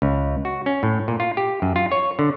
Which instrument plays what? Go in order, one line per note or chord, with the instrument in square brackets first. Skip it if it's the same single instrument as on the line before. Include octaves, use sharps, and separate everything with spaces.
[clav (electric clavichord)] C#2
F#4
C#4
A2
A#2
F4
G4
F#2
F4
C#5
D3